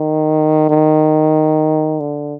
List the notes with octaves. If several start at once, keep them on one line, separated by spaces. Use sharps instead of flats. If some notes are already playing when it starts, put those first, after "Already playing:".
Already playing: D#3
D#3
D3